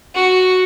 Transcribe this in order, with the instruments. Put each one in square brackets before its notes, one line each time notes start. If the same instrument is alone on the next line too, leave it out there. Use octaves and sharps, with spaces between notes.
[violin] F#4